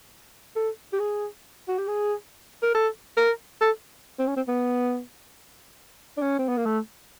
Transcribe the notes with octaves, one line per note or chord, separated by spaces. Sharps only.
A4
G4
G#4
F#4
G4
G#4
A#4
A4
A#4
A4
C4
C#4
C4
B3
D4
C#4
C4
B3
A#3
A3